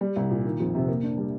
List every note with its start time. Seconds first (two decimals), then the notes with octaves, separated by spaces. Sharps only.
0.01 G3
0.16 C2
0.30 A#2
0.45 D#3
0.60 F2
0.75 C3
0.88 A#3
1.03 D4
1.18 G3